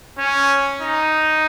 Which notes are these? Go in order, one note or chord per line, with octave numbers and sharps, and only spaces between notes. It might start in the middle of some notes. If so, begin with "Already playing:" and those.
C#4
D#4